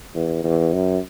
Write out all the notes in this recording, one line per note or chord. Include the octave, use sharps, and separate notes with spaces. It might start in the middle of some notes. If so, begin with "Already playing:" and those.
E2
E2
F#2